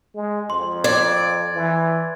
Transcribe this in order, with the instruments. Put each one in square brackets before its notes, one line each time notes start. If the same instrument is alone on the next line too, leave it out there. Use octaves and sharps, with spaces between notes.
[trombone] G#3
[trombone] F2 [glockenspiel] C6
[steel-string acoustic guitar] D5 [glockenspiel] G#6
[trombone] E3